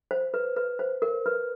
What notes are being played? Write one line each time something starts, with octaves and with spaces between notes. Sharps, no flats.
C5
B4
B4
C5
A#4
B4